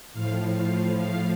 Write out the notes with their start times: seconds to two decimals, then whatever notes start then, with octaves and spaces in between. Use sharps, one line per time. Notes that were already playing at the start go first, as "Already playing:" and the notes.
0.13 A2 F3 F5
0.54 F5
0.94 F5